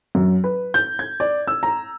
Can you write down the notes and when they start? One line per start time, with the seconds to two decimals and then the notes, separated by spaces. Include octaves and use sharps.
0.15 F#2
0.44 B4
0.74 G6
0.99 G#6
1.20 D5
1.47 E6
1.63 A#5